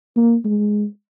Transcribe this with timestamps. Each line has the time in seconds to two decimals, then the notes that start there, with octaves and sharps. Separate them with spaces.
0.16 A#3
0.45 G#3